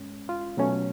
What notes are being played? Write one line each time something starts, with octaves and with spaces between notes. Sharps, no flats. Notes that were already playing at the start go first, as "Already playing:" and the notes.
Already playing: G#2 G#3 C#4
F4
B2 F#3 A3 C#4